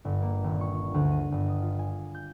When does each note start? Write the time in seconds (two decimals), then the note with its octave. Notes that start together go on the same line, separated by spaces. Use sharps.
0.05 G1
0.22 A#3
0.44 D#1
0.61 C#6
0.94 D2
1.11 D#7
1.32 G1
1.48 D#6
1.62 F4
1.79 G#5
2.14 G6